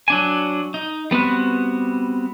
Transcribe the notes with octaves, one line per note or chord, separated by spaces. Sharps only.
F#3 D4 G#5
D#4
G3 B3 C4 F#4